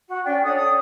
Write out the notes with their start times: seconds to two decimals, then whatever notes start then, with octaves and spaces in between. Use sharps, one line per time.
0.07 F#4
0.24 C#4 D4 G5
0.43 A4 C#5 D5 D#6
0.57 D#6